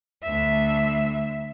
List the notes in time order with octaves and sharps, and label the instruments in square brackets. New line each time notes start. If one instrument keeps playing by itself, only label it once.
[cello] D2 E5